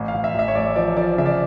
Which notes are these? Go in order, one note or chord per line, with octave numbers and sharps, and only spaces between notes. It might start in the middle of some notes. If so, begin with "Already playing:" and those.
Already playing: A1
F5
A1
E5
A1 E5
C#5
A1 D5
F3 D5
F3 D5
C#3 E5
D5